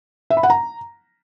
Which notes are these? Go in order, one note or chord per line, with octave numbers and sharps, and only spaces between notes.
E5
B5
F#5
A#5